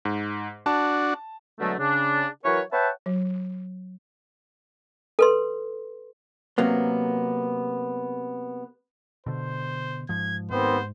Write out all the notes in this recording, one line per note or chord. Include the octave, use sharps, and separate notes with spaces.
G#2
D4 F#4 A5
B2 D3 F#3 G#3 A3
C#3 D4
E3 F#3 A#4 B4 C#5
B4 C#5 E5 F#5 G5 A5
F#3
A4 B4 C6
C3 F#3 A#3 B3
B2 D3 C5
G#2 F3 G#6
D#2 G#2 B3 C4 C5